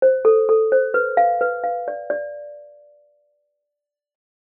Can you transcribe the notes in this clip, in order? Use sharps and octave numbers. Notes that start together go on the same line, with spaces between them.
C5
A4
A4
C5
B4
F5
B4
F5
D5
D5